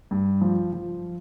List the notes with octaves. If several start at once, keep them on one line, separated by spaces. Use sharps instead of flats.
G2
F3
F3